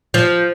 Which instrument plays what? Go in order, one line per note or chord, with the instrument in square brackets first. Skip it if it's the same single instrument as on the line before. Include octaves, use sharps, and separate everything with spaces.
[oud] F3